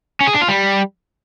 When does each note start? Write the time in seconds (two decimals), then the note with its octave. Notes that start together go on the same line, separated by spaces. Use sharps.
0.20 C#4
0.27 G#4
0.34 D4
0.41 F4
0.48 G3